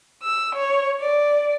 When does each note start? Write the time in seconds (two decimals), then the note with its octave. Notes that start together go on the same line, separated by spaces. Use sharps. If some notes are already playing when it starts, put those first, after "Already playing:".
0.24 E6
0.57 C#5
1.01 D5